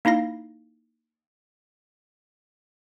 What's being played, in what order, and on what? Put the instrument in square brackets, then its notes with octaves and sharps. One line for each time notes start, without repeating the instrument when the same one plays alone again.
[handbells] A#3 D#4 E4 F5 A#6